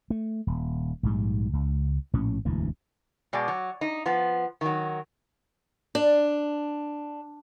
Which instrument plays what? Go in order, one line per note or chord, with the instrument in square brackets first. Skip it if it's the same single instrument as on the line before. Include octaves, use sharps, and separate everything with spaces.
[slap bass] A3
D#1
A#1 G#2 G3
C#2
A#1 A2 C#4
E1 D2 G#2 E3
[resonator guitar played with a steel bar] B2 G#3 D5
F#3
D#4
F3 B3
D#3 F#3
[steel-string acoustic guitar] D4